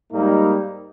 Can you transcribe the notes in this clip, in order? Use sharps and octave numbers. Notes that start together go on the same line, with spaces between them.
G#2 G3 A#3 D#4